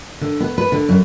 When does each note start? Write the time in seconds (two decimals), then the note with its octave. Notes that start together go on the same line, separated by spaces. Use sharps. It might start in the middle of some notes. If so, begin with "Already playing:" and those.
0.21 D3
0.40 B3
0.58 B4
0.72 D3
0.89 F#2